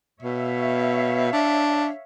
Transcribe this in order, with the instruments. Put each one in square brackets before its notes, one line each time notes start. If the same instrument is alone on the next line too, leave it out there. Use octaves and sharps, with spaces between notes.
[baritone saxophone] B2 [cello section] C#5 E5 F5
[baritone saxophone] D4